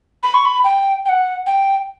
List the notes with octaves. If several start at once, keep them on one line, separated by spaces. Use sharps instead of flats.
B5
C#6
B5
G5
G5
F#5
G5